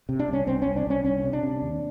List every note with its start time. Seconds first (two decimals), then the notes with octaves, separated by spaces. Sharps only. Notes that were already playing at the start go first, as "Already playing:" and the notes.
0.09 C3
0.19 D4
0.28 C2 C#4
0.47 C2 C4
0.62 C2 C#4
0.76 D4
0.86 C2 C#4
1.04 C2 C#4
1.24 C3
1.33 D4
1.43 C3
1.62 D#2